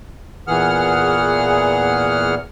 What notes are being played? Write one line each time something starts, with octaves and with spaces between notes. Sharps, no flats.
E2 A#2 E3 G#4 F#5 F6